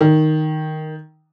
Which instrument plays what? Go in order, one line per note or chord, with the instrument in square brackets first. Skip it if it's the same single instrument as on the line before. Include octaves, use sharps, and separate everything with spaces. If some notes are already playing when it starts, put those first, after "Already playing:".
[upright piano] D#3